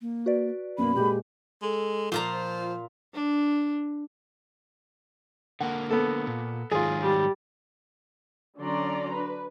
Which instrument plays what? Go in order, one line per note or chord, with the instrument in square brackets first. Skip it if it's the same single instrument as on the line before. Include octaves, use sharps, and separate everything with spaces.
[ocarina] A#3
[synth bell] F#4 B4 D5
[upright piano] F#2 B2 [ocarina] A#3 [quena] B5
[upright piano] A#2 G#3 [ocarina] G4
[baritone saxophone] G#3 [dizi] A4
[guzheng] A#2 F4 A#5 [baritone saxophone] F3
[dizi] C5
[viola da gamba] D4
[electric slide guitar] D3 A#3 [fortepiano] F#5
[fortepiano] B3 A4
[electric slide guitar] A#2
[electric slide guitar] G#2 D#3 F#3 [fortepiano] F4 G#4
[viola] G3
[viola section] D3 F#3 C#4 D5 A#5 C6
D4 B4